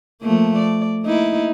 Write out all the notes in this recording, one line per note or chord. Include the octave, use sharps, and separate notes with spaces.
F3 A3 A#3
D5
A#3 D#4 E4